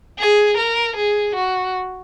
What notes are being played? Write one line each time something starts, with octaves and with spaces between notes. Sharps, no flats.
G#4
A#4
G#4
F#4